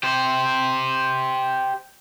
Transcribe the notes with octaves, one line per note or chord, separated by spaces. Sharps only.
G4 C5